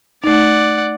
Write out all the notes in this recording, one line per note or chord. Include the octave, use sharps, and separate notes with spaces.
A3 D#4 D5 F#5